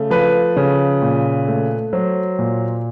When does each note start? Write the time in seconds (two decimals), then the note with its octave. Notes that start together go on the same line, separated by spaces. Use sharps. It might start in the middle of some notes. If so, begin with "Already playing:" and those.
Already playing: C#3 A3
0.10 F3 B4
0.57 C#3
1.02 A#2
1.48 A3
1.93 F#3 C5
2.39 A#2